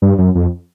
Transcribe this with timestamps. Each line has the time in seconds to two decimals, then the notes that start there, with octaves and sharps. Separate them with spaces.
0.02 G2
0.18 F#2
0.35 F2